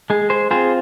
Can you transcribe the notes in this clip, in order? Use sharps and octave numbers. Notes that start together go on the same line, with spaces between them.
G#3 G#4
G#4 C5
C4 F4 G#4 C5